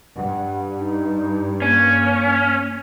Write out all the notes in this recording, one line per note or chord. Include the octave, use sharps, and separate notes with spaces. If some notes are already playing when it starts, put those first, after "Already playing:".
G2 F#5
D#4
A#3 C#4